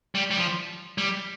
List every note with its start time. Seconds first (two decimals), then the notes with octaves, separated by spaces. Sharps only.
0.15 G3
0.31 G3
0.37 F3
0.98 G3